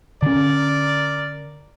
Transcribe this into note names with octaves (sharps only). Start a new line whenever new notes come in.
D3 C#4 A#4 D5